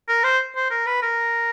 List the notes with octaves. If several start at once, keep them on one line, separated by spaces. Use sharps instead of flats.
A#4
C5
C5
A#4
B4
A#4